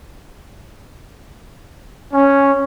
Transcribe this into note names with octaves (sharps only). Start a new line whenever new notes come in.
C#4